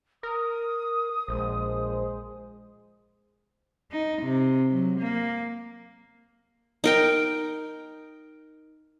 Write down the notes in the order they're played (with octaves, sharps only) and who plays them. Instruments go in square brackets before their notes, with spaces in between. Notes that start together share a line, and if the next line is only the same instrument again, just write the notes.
[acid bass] A#4 [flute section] D#6
[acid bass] A#1 [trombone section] G#3 C5
[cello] D#4
C3
F#3
A#3
[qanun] D#4 A#4 G5